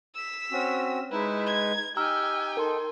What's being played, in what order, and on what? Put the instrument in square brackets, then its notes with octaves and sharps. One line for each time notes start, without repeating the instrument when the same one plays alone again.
[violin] E6 B6
[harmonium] C4 C#4 F#4
[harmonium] G#3 D#4 B4 [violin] E4
[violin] G#6
[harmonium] D#4 G4 [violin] G5 G#5 [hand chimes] A#5 E6 F6
[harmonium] D#4 A4 [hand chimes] A#4 C6